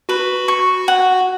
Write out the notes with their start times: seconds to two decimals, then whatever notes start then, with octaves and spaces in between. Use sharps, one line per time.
0.09 F#4 B4
0.48 C#6
0.88 F#5